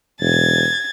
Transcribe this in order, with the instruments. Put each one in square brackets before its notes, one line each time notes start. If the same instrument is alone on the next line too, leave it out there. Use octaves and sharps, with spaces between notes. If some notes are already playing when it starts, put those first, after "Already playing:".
[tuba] E1 [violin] G#6 A6